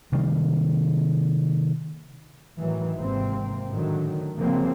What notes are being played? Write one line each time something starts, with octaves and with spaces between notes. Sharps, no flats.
C3 D#3 G3 A#3
A2 D#3 E3 F#3
G#1 C3 A#3 C4
A2 D3 D#3 F#3
C#3 F3 F#3 A#3 C4